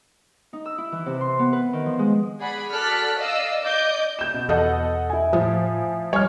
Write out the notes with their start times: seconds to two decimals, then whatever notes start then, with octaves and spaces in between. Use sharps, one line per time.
0.53 D#4
0.65 E6
0.78 E4
0.92 E3
1.06 C3
1.21 C6
1.39 B3
1.53 B4
1.73 D#3
1.86 F3
1.99 G#3
2.39 G#4 D5 F#5 B5
2.71 F#4 A4 D5 F6 F#6 B6
3.19 D5 D#5 F5 E6
3.63 D5 D#5 D6 G6
4.19 G6 E7
4.34 B2
4.49 E2 A4 D#5 F#5
5.10 E4 G#5
5.33 A2 F3
6.13 G3 C#5 G#5 F6